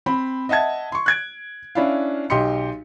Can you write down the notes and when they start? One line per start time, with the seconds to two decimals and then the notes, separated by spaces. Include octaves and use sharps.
0.06 C4 B5
0.49 D#5 E5 F#5 A5 G#6
0.92 C6 C#6
1.06 F#6 G#6 D7
1.75 C#4 D4 E4 F5
2.30 B1 G4 D#5 C6 C#7